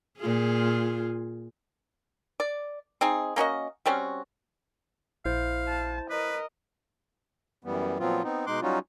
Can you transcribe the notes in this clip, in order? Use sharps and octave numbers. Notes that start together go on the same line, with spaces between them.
A#2 F4 G#4
D5
C4 D#4 G#4
A#3 C#4 F#4 D#5
G3 C4 C#4 F#4
A#1 E4 C5 F5
A5
A#4 B4 D#5
F#2 E3 G3 B3
A#2 F3 F#3 B3 C4 F4
B3 C4 D#4
B2 G#3 D#4 C6 D6 F#6
F#3 G3 C#4 D#4 F4 F#4